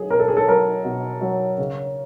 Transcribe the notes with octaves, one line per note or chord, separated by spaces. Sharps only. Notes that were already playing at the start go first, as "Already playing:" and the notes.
Already playing: F#3 G#4
B2 A#4
A4
G#4
A4
F#3 A#4
B2
F#3
C#3